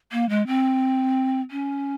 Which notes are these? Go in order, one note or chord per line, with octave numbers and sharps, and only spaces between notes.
A#3
G#3
C4
C#4